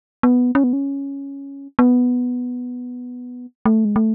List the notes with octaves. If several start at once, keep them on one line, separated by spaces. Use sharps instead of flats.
B3
C#4
B3
C#4
B3
A3
G#3
A3